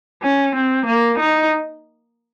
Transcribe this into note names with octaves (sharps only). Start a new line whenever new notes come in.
C#4
C4
A#3
D#4